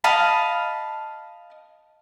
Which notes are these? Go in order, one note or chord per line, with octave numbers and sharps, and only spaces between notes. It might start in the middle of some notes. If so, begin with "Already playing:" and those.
D#5 F5 A5 B5